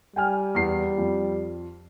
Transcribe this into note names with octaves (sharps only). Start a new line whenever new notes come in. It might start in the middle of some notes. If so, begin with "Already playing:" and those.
G3 G5 G#5 F6
E2 C7
F2